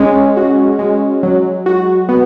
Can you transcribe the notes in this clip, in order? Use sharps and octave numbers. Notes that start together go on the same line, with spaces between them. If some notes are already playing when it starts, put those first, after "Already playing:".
Already playing: G#3 C#4
F#4
G#3
F#3
F#4
B3